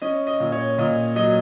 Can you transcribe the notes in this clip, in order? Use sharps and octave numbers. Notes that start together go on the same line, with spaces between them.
C#4 D#5
D#5
A#2
C#5
A#2 D#5
F#3 D#5